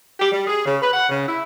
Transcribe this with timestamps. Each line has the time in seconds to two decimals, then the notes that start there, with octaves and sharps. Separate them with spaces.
0.20 G4
0.31 G3
0.47 G#4
0.65 C#3
0.81 B4
0.92 F#5
1.09 C#3
1.27 E4